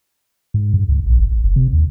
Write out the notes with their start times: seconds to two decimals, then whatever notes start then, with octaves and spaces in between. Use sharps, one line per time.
0.54 G#2
0.74 G2
0.89 C#2
1.06 A#1
1.19 G1
1.32 G#1
1.44 F#1
1.56 C3
1.73 D#2